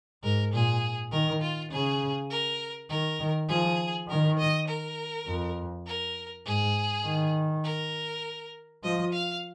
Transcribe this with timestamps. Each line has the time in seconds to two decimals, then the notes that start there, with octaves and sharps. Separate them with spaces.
0.23 G#2 A#4
0.53 A#2 G#4
1.12 D#3 A#4
1.42 F4
1.71 C#3 G#4
2.30 A#4
2.90 D#3 A#4
3.20 D#3
3.49 F3 G#4
4.09 D#3 A#4
4.38 D#5
4.68 A#4
5.27 F2
5.87 A#4
6.46 G#2 G#4
7.05 D#3
7.64 A#4
8.83 F3 D#5
9.13 F5